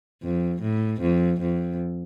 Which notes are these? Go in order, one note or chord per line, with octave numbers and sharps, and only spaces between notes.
F2
A2
F2
F2